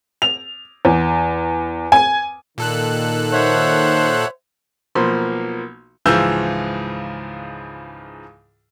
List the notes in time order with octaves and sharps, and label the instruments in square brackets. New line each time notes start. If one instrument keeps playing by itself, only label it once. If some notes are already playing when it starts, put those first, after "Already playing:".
[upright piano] F7
E2
G#5
[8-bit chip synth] A#2 A4 F#6 [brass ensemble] D#3
[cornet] C5 [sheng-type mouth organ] C#5 E5 F#5
[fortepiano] B1 F3 A#3 B5 C6
[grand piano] C#2 G#2 E3 F3 E6 G6